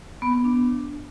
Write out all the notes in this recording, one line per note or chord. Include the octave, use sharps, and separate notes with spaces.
B3
B3
D4